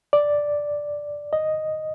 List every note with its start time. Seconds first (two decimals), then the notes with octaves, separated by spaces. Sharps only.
0.13 D5
1.33 D#5